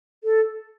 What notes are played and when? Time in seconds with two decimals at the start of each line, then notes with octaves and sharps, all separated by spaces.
0.24 A4